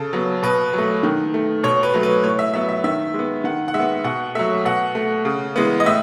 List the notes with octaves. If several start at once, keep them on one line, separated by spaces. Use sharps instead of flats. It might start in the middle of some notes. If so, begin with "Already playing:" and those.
Already playing: C#3 A4
F#3 B3
B2 B4
F#3 A3
D#3
A3
B2 C#5
B4
F#3 A3
B4
A2 C#5
E5
F#3 B3 E5
E5
D#3 E5
G#3
B3
D#3 F#5
F#5
G#3 E5
B3
B2 F#5
F#3 A3 E5
B2 F#5
A3
C#3
E3 G#3 B3
D#5
A2 E5